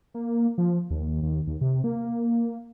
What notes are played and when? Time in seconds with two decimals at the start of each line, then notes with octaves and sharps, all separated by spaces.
0.14 A#3
0.58 F3
0.90 D#2
1.22 D#2
1.47 D#2
1.61 C3
1.84 A#3